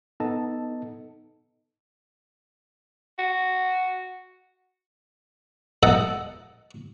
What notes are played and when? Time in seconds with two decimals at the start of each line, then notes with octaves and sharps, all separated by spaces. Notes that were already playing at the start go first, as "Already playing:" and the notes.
0.20 B3 D#4 A4 D#5 A5
3.19 F#4
5.83 A4 D#5 E5 F#5 G5